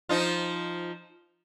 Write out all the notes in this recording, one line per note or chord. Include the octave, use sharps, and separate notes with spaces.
F3 D#4 F4